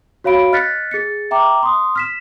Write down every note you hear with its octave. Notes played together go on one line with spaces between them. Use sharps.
F#4 C#5 F5 B5 D7
D#5 F6 F#6 A6 B6 C#7
G#4 A6 C#7
E5 G5 A#5 D6
C6 D#6
F6 B6 E7